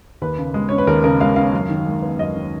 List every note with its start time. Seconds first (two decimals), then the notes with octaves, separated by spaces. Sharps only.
0.22 D#2 B4
0.38 C#3
0.54 G#3
0.69 C#4 C#5
0.78 B4
0.87 D#2 A#4
1.04 C#3 A#4
1.20 G#3 F5
1.36 C#4 F5
1.53 F#2
1.69 D#3
1.86 G#3
2.02 B3
2.19 F#2 D#5
2.35 D#3